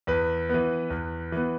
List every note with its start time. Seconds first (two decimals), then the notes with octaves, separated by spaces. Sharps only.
0.07 E2 B4
0.49 E3 B3
0.90 E2
1.32 E3 B3